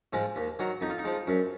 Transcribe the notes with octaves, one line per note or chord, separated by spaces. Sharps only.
G#2 F3 G#3
D#2
D#3 F#3
F2 D#4
F4
D#4
F3 G#3
F#2